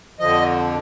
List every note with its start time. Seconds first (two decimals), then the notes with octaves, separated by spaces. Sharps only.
0.19 F2 D3 F3 D#5